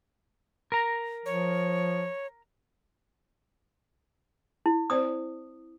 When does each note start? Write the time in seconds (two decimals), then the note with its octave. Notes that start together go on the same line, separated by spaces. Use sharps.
0.72 A#4 A#5
1.26 F3 C#5
4.66 E4
4.90 C4 C5 D5 D#6